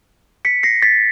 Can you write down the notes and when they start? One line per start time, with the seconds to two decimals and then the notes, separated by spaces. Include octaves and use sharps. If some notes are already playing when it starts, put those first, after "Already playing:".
0.45 B6 C#7
0.63 A#6 C7
0.82 A6 B6